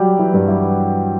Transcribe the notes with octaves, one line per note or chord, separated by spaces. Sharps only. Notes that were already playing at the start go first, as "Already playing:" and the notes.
Already playing: F#3 G3 F#4 G4
E3 E4
G2 G3
E3 E4